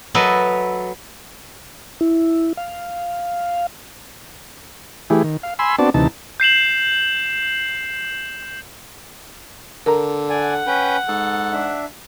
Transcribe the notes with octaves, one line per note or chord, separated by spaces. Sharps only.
F#3 A4 B4 D#5 E5
E4
F5
E3 A3 E4 G4 G#4
D#3
F5
G#5 B5 C6 E6
B3 C4 D4 F#4 D5 A5
D2 C3 E3 D#4 A5
G6 C7 E7 F#7
D3 A#4 A#5
D5 F#5 G#5
C#4 B4 G5
G#2 A4 A5
D4 E5